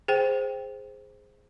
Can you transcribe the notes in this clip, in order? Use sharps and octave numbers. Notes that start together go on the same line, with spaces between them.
G#4 C5 G5